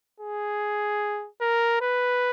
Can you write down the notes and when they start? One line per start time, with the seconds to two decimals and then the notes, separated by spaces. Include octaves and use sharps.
0.20 G#4
1.41 A#4
1.81 B4